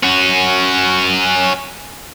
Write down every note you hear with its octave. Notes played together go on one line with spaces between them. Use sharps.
C#4 F#4